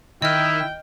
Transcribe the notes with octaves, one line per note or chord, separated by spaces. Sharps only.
D#3 E4 D#5 G5 F6